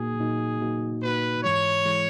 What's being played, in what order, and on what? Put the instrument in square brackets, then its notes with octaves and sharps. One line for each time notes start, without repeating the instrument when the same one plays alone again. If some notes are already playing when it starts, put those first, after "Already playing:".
Already playing: [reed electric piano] A#2 A#3 D#4 F#4 [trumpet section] G#4
[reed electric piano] A#2 A#3 D#4 F#4
A#2 A#3 D#4 F#4
[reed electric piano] A#2 A#3 D#4 F#4 [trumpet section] B4
[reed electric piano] G#2 E3 G#3 [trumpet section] C#5
[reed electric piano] E3 G#3